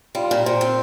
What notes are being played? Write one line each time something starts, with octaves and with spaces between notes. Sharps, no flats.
G3 F4
A#2
A#2 C5
C4